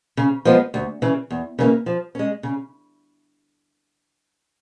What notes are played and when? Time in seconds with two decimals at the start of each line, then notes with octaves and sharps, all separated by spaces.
0.17 C#3
0.45 F3 G#3 B3
0.74 D2
1.02 C#3 E3
1.31 E2
1.59 C#3 E3 G3 A#3
1.86 F3
2.15 G#3 C#4
2.43 C#3